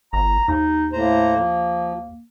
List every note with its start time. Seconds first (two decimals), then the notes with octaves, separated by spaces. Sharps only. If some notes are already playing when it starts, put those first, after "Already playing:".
0.13 G1 A#5
0.48 D#2 D#4
0.92 A2 A#3 C5 A#5
1.37 F3